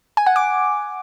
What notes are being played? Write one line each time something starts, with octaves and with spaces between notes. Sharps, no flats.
G#5
F#5
D6